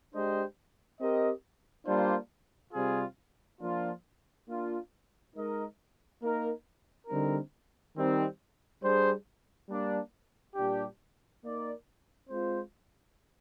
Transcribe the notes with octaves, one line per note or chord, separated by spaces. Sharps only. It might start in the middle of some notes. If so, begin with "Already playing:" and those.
G#3 D4 G4 C5 D#5
C4 G4 A#4 D#5
G3 A#3 D4 F4 C5
C3 G3 C4 F4 G#4
F3 A#3 D4 F4
A#3 D4 F4
G#3 D#4 A#4 D#5
A#3 D#4 A#4
D3 G3 C4 D#4 A#4
D#3 G3 C4 D#4
G3 D4 G#4 C5
G3 A#3 D4
A#2 G3 D4 G4
A#3 D#4 A#4 D5
G#3 C4 F4 C5